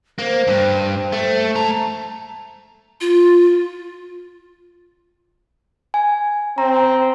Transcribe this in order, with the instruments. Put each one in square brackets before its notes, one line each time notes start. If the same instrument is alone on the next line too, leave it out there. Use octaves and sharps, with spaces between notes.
[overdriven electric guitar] A#3 [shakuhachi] C5
[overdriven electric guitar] G2
A3
[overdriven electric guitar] A3 A#5 [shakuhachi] A5
[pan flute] F4
[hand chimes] G#5
[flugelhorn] C4 [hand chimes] A#5